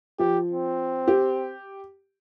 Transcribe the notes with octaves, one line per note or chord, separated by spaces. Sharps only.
F3 G4
C4
G4